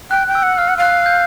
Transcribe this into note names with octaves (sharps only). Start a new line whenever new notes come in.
G5 F#6
G5
E6
F#5
F5 F6
F#5
F5 F#6
G6